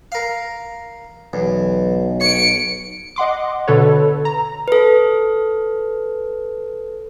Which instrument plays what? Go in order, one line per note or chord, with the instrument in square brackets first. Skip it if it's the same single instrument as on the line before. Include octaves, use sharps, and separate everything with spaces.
[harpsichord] A#4 F5
[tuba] B1 [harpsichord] E2
[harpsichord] C#5 [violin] C#7 D7
[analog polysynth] D#5 F#5 C6 D6
B2 D3 A4 B4 C#5
A#5
[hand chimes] A4 B4